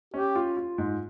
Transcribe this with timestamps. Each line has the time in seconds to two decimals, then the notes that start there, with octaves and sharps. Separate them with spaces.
0.14 C#4 G4
0.35 F4
0.57 F4
0.78 G#2